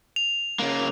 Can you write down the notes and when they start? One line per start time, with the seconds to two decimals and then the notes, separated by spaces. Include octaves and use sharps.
0.16 F7
0.59 C#3 A#3